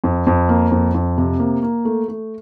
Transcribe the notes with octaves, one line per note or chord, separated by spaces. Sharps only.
F2
F2
A#3
F2
F2
C3
A#3
A#3
A3
A3